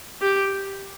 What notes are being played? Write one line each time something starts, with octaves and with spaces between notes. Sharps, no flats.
G4